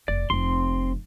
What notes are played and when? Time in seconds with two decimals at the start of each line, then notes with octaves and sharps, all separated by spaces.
0.08 F1 D5
0.30 F1 C4 C6